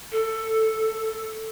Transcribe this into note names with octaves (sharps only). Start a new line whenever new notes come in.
A4